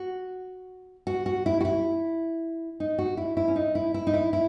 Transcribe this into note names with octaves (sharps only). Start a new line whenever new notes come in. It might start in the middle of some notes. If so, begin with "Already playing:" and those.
Already playing: F#4
F#4
F#4
E4
F#4
E4
D#4
F#4
E4
E4
C#4
D#4
E4
E4
D#4
E4
E4